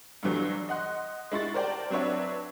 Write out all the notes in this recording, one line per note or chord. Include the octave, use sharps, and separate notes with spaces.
G2 D3 E3 F#3
D#5 F#5 C6 F#6
G#3 E4 C#6 A6
A#4 C5 D5 G5 A5
F#3 C4 D4 B4 C#5 E5